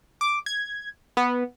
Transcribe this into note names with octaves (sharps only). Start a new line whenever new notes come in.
D6
G#6
B3